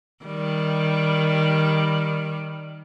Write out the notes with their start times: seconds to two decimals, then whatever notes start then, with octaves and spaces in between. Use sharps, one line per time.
0.25 D#3 G3